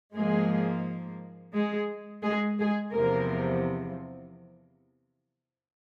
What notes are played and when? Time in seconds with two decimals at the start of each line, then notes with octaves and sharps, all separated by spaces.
0.14 G#2 F3 G#3 A#3 G#4
1.54 G#3 G#4
2.23 G#3 G#4
2.58 G#3 G#4
2.93 E2 C3 F3 A#3 A#4